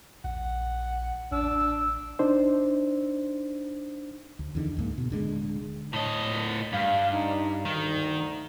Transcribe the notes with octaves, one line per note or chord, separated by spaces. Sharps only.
A#1 F#5
A1 D4 E6
D4 D#4 C5
D2
E2 D3 D#3
C#2 G#2 A#3
B2
D1 D3 G#3
A2 C#5 D#5 A5
A#2
G2 F5
D4 D#4
D2 D#3